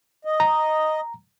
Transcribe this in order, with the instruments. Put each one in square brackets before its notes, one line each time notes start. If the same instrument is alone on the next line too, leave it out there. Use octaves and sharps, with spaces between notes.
[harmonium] D#5
[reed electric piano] A#5